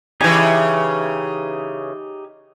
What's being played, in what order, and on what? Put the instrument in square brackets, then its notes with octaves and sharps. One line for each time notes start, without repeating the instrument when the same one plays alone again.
[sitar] C#3 E3 [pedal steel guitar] D#4 G4 G#5